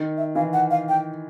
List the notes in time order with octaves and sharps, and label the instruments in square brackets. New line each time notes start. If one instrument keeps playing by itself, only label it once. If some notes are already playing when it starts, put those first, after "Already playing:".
Already playing: [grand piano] D#3
[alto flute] E5
[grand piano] E3 [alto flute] F5
[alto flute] F#5
F5
G5